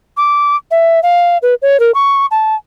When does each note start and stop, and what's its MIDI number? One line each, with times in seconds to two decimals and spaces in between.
0.17 0.56 86
0.71 1.00 76
1.03 1.38 77
1.42 1.54 71
1.62 1.79 73
1.80 1.91 70
1.95 2.26 85
2.31 2.55 81